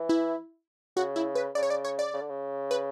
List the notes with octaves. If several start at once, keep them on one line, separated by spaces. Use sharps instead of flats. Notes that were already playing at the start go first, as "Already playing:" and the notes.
Already playing: E3
E4
C#3 F#4
E4
B4
C#3 D5
C#5
D5
C#5
D5
C#3
D3
C#3
B4